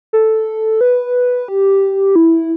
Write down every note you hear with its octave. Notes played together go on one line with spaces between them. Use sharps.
A4
B4
G4
E4